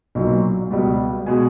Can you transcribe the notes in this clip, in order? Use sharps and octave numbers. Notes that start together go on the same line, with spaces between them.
B1 A#2 F#3
C#2 B2 G3
B2 G#3 G#5